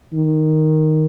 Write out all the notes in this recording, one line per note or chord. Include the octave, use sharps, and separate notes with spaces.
D#3